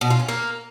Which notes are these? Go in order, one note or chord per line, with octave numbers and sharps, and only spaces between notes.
B2
F4
C#4
A#3